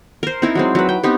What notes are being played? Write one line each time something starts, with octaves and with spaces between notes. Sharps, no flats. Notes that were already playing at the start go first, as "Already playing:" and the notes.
A#4 C5
C4 D#4 E4 A#4
F#3 G#3 C4
F#3 B4
G5
B3 C4 D#4 G4